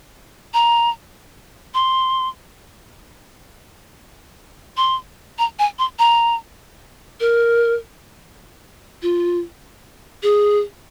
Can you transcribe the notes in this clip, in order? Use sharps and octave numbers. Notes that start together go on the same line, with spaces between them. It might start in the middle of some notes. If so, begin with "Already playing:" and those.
A#5
C6
C6
A#5
G#5
C6
A#5
A#4
F4
G#4